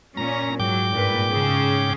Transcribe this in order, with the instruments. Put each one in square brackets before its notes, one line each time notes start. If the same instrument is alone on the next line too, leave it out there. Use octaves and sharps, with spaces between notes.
[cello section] A#2 C#4 [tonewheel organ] A#5
[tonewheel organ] G#2 G5 D6 [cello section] F#3
[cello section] G2 A#2 B4
C#3 C#4 G#4